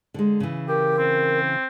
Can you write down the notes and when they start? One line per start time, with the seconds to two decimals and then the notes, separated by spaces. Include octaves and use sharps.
0.14 D3 G#3
0.40 C#3 E3
0.68 G4 A#4
0.98 C4